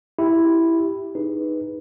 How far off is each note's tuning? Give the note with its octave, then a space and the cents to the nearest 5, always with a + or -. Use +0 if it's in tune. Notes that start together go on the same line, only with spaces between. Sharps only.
E4 +0 G4 +0
D#4 +0 G#4 -5 B4 -5